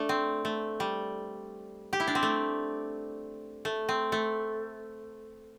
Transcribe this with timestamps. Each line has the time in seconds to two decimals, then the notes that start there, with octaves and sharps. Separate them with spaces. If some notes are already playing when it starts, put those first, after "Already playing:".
Already playing: A3 D4 A4
0.09 C4
0.45 A3
0.80 G3
1.93 G4
2.00 E4
2.07 D4
2.15 C4
2.23 A3
3.65 A3
3.89 C4
4.12 A3